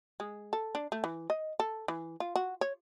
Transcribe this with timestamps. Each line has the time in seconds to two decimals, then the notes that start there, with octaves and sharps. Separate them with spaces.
0.20 G#3
0.53 A4
0.75 D4
0.92 A3
1.04 E3
1.30 D#5
1.60 A4
1.88 E3
2.20 F4
2.36 F#4
2.61 C#5